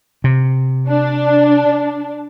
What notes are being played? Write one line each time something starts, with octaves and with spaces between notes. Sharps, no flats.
C3
D4